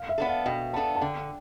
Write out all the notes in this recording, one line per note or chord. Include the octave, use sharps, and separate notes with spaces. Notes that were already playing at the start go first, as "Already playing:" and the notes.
Already playing: F5
E5
B3 D4 A4
F5
B2 G5
B3 D4 A4 A5
A5
D3 G5